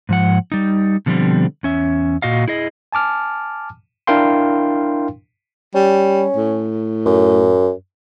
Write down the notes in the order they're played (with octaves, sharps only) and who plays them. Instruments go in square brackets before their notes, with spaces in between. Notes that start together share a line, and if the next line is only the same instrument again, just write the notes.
[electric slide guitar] G#2 F3 F#5
G3 D#4
B2 D3 F3 G3 C4
E2 C#4 E5
A#2 F#4 D#5 F5
E4 G#4 D#5
[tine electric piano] G#5 A5 D6 F6
D4 E4 A#4 F5 G5 C6
[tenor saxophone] G3 [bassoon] C#4
[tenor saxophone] A2
[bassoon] F#2